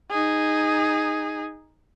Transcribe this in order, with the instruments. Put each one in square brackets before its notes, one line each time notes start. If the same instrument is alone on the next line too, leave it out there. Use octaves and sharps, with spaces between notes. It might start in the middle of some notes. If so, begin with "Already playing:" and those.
[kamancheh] D#4 G#4